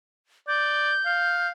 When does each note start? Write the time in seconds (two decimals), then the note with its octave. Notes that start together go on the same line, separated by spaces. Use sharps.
0.48 D5 G6
1.06 F5